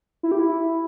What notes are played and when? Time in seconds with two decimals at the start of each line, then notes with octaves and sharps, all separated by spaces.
0.23 E4
0.31 G4
0.39 E4